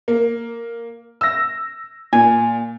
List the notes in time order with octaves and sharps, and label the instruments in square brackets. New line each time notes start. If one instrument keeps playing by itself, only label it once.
[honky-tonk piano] A#3
E6 A#6
[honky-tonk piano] A#2 [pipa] G#5